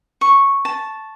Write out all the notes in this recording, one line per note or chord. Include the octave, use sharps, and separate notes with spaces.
C#6
A5